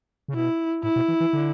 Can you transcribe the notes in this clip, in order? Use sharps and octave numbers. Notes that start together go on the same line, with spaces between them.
C#3
B2 E4
A2 E4
B2
E3
E3
D3